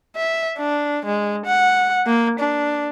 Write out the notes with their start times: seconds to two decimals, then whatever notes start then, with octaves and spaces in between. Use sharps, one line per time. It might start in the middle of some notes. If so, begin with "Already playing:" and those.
0.16 E5
0.58 D4
1.05 G#3
1.45 F#5
2.06 A#3
2.39 D4